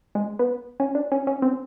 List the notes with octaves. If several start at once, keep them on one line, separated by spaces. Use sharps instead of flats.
G#3
B3
C#4
D4
C#4
C#4
C4